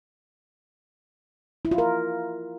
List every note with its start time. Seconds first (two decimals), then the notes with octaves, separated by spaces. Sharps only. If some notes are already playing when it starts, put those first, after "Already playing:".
1.65 E4
1.71 F4
1.78 A#4